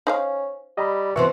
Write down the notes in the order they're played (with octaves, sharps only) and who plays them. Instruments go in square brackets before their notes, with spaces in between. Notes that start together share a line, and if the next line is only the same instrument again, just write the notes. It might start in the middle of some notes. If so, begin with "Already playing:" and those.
[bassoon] C#4 [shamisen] D#4 C5 F5
[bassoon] G3 [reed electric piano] D#5 A#5 B5
[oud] G2 E3 C4 [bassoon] B2 [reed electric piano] E5 C#6